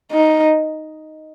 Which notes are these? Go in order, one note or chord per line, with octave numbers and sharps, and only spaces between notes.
D#4